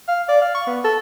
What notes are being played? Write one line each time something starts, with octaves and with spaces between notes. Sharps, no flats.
F5
D5
F5
C#6
B3
A4